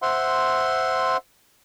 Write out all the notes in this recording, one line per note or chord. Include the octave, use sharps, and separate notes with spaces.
C5 E5 F#5 C6